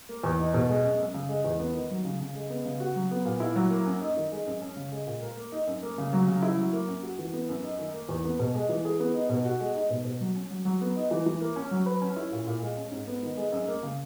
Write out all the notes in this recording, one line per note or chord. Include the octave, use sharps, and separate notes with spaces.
A#3
E2
D#4
B2
G#3
F#2
F#2
C#3
G#3
E2
B3
D#3
F#3
C#3
C#3
G#3
B3
C#3
F#4
F#3
B3
A#2
E4
F#3
A#3
F#2
D#4
D#3
G#3
F#2
C#4
C#3
G#3
A#2
A#4
A#3
D#4
F#2
A#3
C#3
F#3
C#3
E4
F#3
A#3
F#2
F#4
E3
B3
F#2
D#4
D#3
A#3
E2
B3
B2
G#3
E3
G#4
B3
D#4
B2
F#4
G#3
D#4
B2
B2
F#3
C#4
F#3
F#3
B3
D#4
E3
E3
A#3
C#4
F#3
B4
C#4
E4
A#2
A#2
G#3
C#4
G#2
B3
D#3
G#3
F#2
A#3
C#3